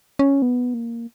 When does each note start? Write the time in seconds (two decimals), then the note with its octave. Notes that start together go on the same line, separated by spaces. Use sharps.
0.19 C#4
0.42 B3
0.74 A#3